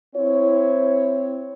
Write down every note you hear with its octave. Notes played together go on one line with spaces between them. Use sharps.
C4 E4 C#5